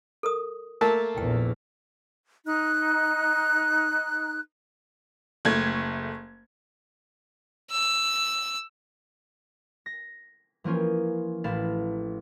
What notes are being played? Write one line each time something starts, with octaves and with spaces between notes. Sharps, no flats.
A4 A#4 D#6
A3 A#3 A#4 A5
A#1 E2 G5
D#4 F#6
F#1 A3 G#6
E6
A#6
E3 F3 A#3 C#4 F4
A1 F5 B5 A6 E7